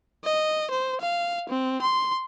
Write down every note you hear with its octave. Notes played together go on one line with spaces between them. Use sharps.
D#5
C5
F5
C4
C6